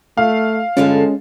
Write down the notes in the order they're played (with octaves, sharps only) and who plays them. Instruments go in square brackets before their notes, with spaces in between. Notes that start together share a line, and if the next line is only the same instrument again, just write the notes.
[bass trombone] A3 [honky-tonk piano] F5
[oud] G2 D3 F4 [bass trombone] G#3 [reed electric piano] C#4